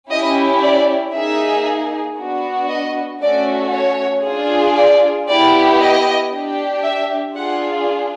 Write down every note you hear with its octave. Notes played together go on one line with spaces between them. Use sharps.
C#4 E4 G4 D#5
D5
A#3 D#4 G#4 E5
B3 D4 F#4
D#5
A3 C#4 F#4 A4 D5
C#5
D4 F4 G#4
D5
B3 E4 G4 D5
D#5
D4 G4
E5
D4 F4 G#4 F#5